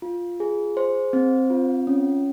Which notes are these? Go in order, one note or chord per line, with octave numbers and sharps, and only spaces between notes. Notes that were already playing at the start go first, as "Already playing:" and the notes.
F4
G#4
C5
C4
F4
C#4